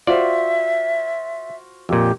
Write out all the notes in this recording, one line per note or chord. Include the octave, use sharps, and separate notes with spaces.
F4 F#4 C5 D5 E5
F2 A#2 G4